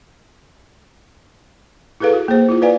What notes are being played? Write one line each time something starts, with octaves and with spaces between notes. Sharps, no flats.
E4 G#4 A4 B4 F5
F#4
A#3 G#4 C5
E4 F4
B4 D5 F5 G#5